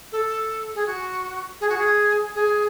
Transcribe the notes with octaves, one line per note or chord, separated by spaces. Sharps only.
A4
G#4
F#4
G#4
F#4
G#4
G#4